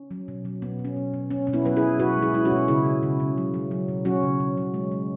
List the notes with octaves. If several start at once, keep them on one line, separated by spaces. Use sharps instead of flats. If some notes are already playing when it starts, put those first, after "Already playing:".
Already playing: C#4
F#3
B2
F#3
B2 B3
F#3
C#4
B2
B2
B2 C#4
B2 C#4
B3 E4
F#3 B4
E4 G#4
F#3
B2 F#4 B4
G#3
E4 G#4
G#3 E4
C#4 F#4
B2
C#3 E4 G#4
C#3
C#3
C#3
F#3
F#3
F#3
B2
F#3 C#4 F#4
C#3
C#3
F#3
G#3
G#3